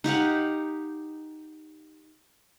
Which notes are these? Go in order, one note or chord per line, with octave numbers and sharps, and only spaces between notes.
D#4 G4 F5 F#5